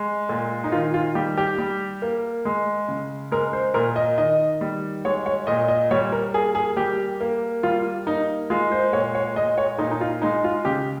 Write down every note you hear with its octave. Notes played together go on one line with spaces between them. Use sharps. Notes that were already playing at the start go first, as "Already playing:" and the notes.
Already playing: G#3
A#2
D#4
D#3 F4
F4
G3 G4
G4
G3
A#3
G#3
C#3
G#3 A#4
C5
A#2 A#4
D#5
D#3 D#5
G3
G#3 C#5
C#5
A#2 D#5
D#5
G3 C#5
A#4
A#3 G#4
G#4
G3 G4
A#3
G3 F4
A#3 D#4
G#3 F4
C5
A#2 C#5
C#5
G#3 D#5
C#5
A#2 D#4
D#4
F4
G#3 D#4
F4
C#3 G4